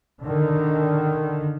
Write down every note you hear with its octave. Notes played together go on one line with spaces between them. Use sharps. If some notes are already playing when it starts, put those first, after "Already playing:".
D3 D#3